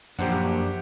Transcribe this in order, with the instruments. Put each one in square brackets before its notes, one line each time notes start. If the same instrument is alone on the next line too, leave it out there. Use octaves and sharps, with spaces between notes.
[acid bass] F#2 [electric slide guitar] F3 A#3 D4 [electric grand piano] G4 C5 F#5